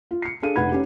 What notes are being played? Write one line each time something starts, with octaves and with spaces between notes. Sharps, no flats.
F4
C7 C#7
D4 G#4 A4 F5 D#7
F1 B4 F#5 B5 G#6
C#4 D#4 G4